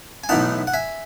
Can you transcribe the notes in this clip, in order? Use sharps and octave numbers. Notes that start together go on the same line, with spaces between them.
G#5
B1 A2 E3 B3 D#4 F#5 A5
F#5
E5 G#5